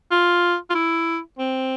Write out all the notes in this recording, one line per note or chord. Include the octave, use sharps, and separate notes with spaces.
F4
F4
E4
C4